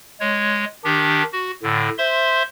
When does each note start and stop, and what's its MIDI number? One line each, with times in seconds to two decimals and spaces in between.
0.20 0.65 56
0.20 0.65 73
0.84 1.23 51
0.84 1.23 62
0.84 1.23 67
1.33 1.51 66
1.63 1.89 45
1.63 1.89 50
1.98 2.43 72
1.98 2.43 76
1.98 2.43 84